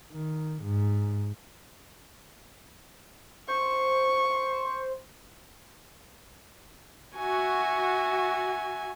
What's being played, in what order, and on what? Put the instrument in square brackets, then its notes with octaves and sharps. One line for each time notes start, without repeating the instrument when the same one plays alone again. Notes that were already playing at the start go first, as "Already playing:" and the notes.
[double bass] D#3
G#2
[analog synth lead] C5 [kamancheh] C#6
[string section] F#4 [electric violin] E5 G#5